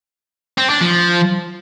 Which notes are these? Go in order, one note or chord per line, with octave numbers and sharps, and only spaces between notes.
C4
D4
F3